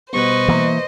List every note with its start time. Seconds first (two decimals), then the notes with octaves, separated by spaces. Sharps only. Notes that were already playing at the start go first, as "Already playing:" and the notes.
0.13 B2 G3 B3 B4 C5 D#5 C#6
0.48 E3 A#3